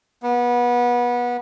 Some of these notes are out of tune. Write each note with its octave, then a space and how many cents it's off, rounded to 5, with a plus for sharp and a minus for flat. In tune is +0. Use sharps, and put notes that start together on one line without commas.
B3 -25